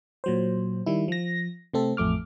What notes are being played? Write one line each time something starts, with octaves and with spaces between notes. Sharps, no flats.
A#2 F#3 C5
D#3 G3 E4
F3 A#6
C3 A3 C4 A4
A1 F2 A3 D6 F6